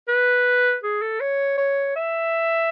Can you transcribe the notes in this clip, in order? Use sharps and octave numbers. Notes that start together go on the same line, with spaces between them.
B4
G#4
A4
C#5
C#5
E5